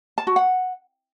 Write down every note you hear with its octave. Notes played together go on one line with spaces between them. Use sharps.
A5
F#4
F#5